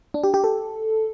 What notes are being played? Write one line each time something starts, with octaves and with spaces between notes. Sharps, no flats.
D4
G4
G4
A4